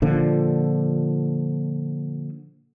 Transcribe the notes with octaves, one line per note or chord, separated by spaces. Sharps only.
A#2 D3 F3